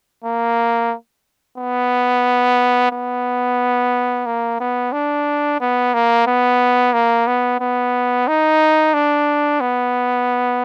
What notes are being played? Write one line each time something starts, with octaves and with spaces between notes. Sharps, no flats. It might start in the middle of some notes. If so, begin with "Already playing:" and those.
A#3
B3
B3
A#3
B3
D4
B3
A#3
B3
A#3
B3
B3
D#4
D4
B3